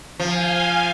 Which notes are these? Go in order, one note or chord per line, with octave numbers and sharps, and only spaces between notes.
F3 F5 G#5